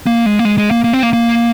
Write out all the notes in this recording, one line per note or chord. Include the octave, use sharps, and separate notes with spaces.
A#3
G#3
A#3
G#3
G#3
A#3
A#3
C4
A#3
A#3